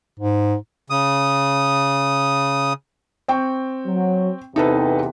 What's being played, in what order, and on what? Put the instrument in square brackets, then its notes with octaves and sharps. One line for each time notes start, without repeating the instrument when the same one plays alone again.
[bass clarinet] G#2
[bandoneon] C#3 D#6
[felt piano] C4 G5 C#6
[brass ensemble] F#3
[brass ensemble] E2 C3 [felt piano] D#4 A4 B4